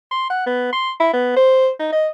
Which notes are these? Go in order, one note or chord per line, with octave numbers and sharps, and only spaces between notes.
C6
F#5
B3
C6
E4
B3
C5
D#4
D#5